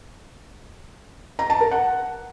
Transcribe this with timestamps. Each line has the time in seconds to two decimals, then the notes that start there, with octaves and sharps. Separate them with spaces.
1.39 A#5
1.50 A5
1.61 A#4
1.71 F#5